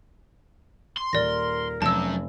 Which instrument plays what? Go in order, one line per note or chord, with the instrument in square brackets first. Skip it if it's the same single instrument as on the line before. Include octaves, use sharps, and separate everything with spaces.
[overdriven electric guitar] C6
[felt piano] D#1 [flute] A#4 [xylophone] D5 A#6
[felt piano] F1 [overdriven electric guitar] F#2 [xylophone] A5 E6